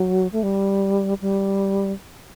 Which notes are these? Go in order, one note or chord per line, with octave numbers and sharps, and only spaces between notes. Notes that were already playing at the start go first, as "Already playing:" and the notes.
Already playing: F#3
A3
G3
G3